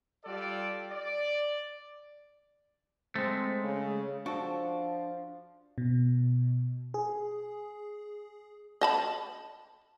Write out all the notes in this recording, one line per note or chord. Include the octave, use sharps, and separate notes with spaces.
G3 F4 G4 A4 D5
D5
G#3 A3 C4
C#3
F3 D4 F#4 A4
B2
G#4
D#5 A5 B5